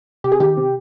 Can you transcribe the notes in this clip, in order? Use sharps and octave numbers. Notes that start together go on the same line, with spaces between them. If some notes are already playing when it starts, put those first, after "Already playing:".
C3 G4
G#4
D#3 G4
C3